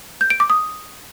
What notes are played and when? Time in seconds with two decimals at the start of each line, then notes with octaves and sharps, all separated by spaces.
0.21 G6
0.30 D7
0.40 D6
0.50 D#6